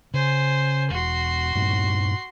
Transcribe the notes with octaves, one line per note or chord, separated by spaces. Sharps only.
C#3 C5 G#5
E1 F#4 C6
G2 A#2 C4